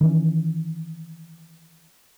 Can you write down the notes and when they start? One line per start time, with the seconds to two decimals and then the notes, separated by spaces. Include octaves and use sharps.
0.01 D#3 E3 C#4